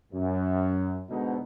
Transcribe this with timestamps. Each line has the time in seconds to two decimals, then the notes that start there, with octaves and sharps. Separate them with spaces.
0.13 F#2
1.09 G#2 B2 D3 D#4